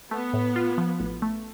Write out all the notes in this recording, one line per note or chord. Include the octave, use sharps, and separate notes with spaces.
A3 B3
A2
F4
F3
A1
A3